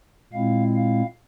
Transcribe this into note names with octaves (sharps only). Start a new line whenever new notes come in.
A#2 G#3 C4 E4 F5
F5